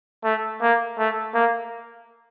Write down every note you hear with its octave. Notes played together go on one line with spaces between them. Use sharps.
A3
A#3
A3
A#3